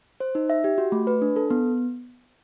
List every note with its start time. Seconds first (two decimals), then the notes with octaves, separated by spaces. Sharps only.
0.20 C5
0.35 D#4
0.50 E5
0.64 G4
0.78 F#4
0.92 A3
1.07 B4
1.22 D4
1.36 A4
1.50 B3